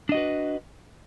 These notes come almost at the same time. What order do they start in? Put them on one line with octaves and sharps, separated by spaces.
D4 D#5 F#4 B4